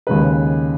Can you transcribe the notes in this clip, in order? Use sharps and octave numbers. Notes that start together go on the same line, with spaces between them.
D#2 C#3 G#3 B4